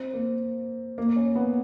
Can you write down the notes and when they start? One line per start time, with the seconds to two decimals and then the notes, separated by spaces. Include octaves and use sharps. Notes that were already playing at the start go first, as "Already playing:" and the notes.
Already playing: C4
0.14 A#3
0.98 A#3
1.16 C#4
1.35 B3